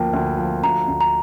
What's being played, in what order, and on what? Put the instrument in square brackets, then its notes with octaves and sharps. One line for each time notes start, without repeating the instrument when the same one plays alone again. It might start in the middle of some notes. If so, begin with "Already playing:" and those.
Already playing: [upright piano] D2 F3 A#3 [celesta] G5
[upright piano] D2
F3
[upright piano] D2 [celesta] A#5
[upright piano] D2
[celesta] A#5